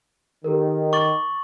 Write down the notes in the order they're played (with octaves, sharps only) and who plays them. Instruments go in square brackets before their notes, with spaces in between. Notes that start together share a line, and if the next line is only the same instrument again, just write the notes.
[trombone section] D#3 [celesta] G4 A4 A#4
[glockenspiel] C#6 F#7 [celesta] D6 A6